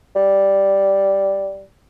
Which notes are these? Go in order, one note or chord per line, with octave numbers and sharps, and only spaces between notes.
G3